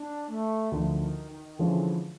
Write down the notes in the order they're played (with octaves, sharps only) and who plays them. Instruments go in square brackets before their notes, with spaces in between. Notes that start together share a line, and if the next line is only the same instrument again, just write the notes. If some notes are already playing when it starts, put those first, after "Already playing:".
Already playing: [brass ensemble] D4
A3
[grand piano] D2 D3 F3 [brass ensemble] D#3
[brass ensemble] D#3
D#3
[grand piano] D3 F3 G#3 C#4 [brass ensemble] E3